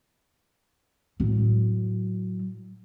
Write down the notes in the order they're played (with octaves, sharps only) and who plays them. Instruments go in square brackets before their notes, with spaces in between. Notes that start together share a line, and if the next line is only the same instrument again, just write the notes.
[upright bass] A2 F#3